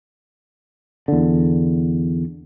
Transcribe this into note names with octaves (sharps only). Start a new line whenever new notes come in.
E2 D3